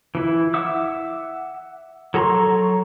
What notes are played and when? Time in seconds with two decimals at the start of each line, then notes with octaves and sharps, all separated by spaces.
0.15 E3 E4
0.54 E5 F#5 D6 E6
2.14 F#3 A4 A#5 C6 C#6